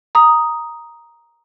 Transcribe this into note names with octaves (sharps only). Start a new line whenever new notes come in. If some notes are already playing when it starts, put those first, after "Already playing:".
A#5 D#6